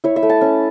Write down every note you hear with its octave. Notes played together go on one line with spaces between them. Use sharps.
E4 C#5
E5
A3
A5
C#4